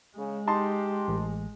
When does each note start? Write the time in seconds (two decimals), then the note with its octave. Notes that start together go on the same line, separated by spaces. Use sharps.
0.18 C#3 G#3
0.47 D#4 G4 A5 C6
1.08 A1